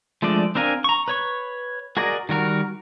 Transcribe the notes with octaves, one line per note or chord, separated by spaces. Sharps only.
F3 G#3 A3 D4 D5
C4 D4 A#4 F5 G#5
A#5 C#6
B4 C#5 C#6
F#4 G#4 A#4 D5 D#5
D#3 G3 F#4 A#4